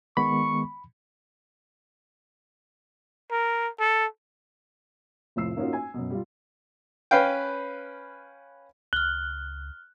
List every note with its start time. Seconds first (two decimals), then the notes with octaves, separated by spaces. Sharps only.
0.17 D#3 G#3 B3 B5 C#6
3.31 A#4
3.79 A4
5.36 F1 A2 F3 E6 C7
5.57 A#3 C#4 D#4 F4 F#4
5.73 G#5
5.94 F#2 B2
6.10 G3 F4
7.11 C#4 B4 F5 G5
8.93 C#2 F6 F#6 G7